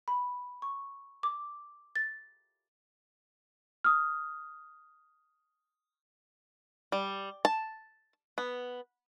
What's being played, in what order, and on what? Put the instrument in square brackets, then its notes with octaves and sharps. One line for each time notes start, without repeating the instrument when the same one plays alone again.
[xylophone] B5
C#6
D6
A6
[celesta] D#6 F6
[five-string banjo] G3
A5
B3